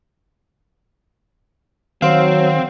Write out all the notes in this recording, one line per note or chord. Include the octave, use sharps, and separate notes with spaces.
D#3 F#3 C4 C5 F5